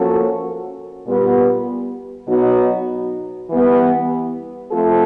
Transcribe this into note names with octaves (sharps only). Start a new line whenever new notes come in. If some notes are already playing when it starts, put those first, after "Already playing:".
Already playing: F3 A#3 C#4 F#4 A4
A#2 G3 B3
B2 F#3 B3 D#4 F#4
E3 G3 B3
F3 A3 C4 F4 A4